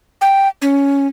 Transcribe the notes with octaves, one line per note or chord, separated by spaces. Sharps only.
G5
C#4